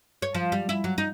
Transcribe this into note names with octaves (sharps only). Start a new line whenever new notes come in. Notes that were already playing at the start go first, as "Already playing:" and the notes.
C#5
F3
G3
E4
F#3
D#4